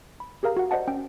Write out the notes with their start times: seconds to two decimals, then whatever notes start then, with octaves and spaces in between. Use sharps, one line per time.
0.20 B5
0.43 G4 G#4 A#4 F5 A#5
0.57 F#4 F#5
0.71 C5 D5 D#5 F#5 A5
0.87 C#4 G5